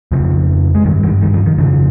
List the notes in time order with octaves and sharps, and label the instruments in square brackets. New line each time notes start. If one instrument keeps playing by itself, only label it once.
[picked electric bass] F2 C#3 F3
G#3
G2 D#3 G3
D#3 G3
D#3 G3
F3
D#3
F2 C#3 F3